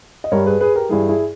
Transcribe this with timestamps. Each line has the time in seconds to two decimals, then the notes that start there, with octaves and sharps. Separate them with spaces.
0.24 D#5
0.31 G2 G3 A#4 C#5
0.46 G#4 B4
0.61 G#4 B4
0.75 G4 A#4
0.89 G2 E3 G3 E4 G#4
1.08 E4 G#4